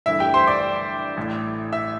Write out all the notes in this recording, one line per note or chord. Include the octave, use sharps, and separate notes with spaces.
G1 G2 E3 A3 E4 E5
G4 G5
C5 C6
D5 D6
A1 A2 A3
E5 E6